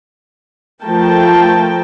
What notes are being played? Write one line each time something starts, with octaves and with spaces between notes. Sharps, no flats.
F3 A3 A#4 G5 A5